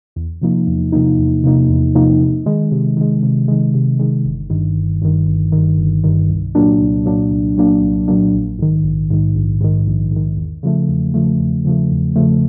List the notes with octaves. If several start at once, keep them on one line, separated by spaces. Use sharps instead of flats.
E2
C3 F3 A#3 D#4
E2
C3 F3 A#3 D#4
E2
C3 F3 A#3 D#4
E2
C3 F3 A#3 D#4
C3
D#3 G#3
C3
D#3 G#3
C3
D#3 G#3
C3
D#3 G#3
G1
G2 D#3
G1
G2 D#3
G1
G2 D#3
G1
G2 D#3
C2
A#2 F#3 A#3 D4
C2
A#2 F#3 A#3 D4
C2
A#2 F#3 A#3 D4
C2
A#2 F#3 A#3 D4
A#1
G#2 D#3
A#1
G#2 D#3
A#1
G#2 D#3
A#1
G#2
D#3
E2
C#3 F3 A3
E2
C#3 F3 A3
E2
C#3 F3 A3
E2
C#3 F3 A3